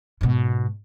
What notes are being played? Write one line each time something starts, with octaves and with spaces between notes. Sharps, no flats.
G#2 B2